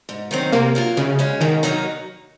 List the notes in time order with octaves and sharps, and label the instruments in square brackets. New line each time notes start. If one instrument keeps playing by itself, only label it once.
[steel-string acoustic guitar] G#2
D#3 F#3 C4
[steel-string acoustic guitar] C3 [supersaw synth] A#3
[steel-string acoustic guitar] F#3 A#3 F4
[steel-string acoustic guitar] F#2 [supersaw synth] C#3
[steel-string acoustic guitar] C#3 G#3 C#4
[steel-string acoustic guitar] G#2 [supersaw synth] D#3
[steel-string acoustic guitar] D#3 F#3 A#3 D#4